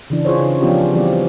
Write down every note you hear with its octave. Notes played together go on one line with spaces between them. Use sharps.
C#3 E3 D4
F4 G#4 C5 C#5
C#3 D#4
F3 B3 C#4 D4 F4 G4
E3 G3 C4 F4 G4 D5